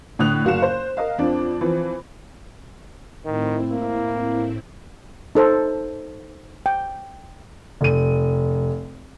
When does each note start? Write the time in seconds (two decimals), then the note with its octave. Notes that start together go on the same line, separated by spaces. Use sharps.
0.19 A2 D3 D#6 F#6 F7
0.45 F#1 F#4 F5 E7
0.62 C5
0.97 A#4 D#5 F5
1.18 F2 C4 D4
1.61 E3 F3 C4
3.25 A2 D#3 C4 E4
3.72 A#3
5.35 D#4 A4 C5
6.66 G5
7.81 F1 D#7